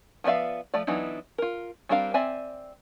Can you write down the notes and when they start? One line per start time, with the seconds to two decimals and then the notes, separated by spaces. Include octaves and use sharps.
0.24 F3 B3 D5 E5 F5
0.74 F3 A3 D5
0.87 E3 F#3 B3 D4 D#4
1.38 F4 A#4
1.89 G3 C4 D4 A#4 F5
2.14 C4 D5 E5 G#5